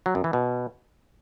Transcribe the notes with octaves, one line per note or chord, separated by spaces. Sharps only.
F#3
F#2
E3
B2